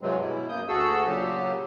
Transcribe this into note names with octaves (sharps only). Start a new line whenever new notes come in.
G2 C3 E3 F#3 G#3 C4
B2 E4
F#2 A#3 D#6 G6
D2 F#4 G#4 A4 E6
A#2 C#3 F#3 G4